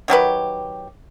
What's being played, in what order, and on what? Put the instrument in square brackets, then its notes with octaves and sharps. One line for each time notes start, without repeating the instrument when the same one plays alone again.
[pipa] D#3 F#3 G4 B4